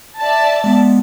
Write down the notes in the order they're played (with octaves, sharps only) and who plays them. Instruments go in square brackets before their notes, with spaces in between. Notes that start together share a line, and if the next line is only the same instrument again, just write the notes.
[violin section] D5 E5 A5
[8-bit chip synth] G#3 B3